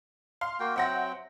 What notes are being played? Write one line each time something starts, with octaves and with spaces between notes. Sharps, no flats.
F5 C6
A#3 F#4 G5
F#3 C4 E5 F#5 G5 A#6